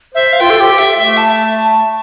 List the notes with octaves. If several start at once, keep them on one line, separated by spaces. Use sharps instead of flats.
C5 E5
F5
F4 G5
A4
G4 G5
E5
A3 E5
A5